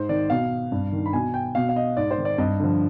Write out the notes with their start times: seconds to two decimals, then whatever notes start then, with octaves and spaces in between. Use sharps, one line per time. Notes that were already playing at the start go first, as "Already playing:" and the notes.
Already playing: G#2 C5
0.09 D#3 D5
0.30 B2 F5
0.72 G2
0.92 D#3
1.06 B5
1.13 B2 G#5
1.34 G5
1.55 B2 F5
1.69 F5
1.76 D#5
1.96 G#2 D5
2.11 C5
2.18 D#3
2.25 D5
2.38 G2 D#5
2.60 D3 F3